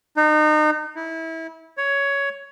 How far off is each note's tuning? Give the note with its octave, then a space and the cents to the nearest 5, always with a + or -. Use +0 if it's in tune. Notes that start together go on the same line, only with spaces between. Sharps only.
D#4 -30
E4 -25
C#5 +10